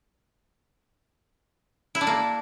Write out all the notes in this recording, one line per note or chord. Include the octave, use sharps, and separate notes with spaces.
E4
D4
A#3